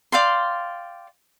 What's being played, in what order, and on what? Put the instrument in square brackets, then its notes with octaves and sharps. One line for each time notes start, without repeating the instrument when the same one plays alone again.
[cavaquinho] D5 F5 G5 C6